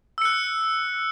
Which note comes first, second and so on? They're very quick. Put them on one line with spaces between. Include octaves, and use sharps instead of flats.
E6 C#7 F#6